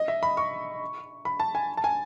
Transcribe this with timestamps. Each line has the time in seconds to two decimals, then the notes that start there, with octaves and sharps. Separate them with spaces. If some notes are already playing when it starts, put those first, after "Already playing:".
Already playing: D#5
0.08 E5
0.23 B5
0.37 C#6
1.25 B5
1.40 A5
1.55 G#5
1.77 A5
1.84 G#5